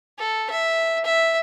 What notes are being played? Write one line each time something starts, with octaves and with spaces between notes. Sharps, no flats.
A4
E5
E5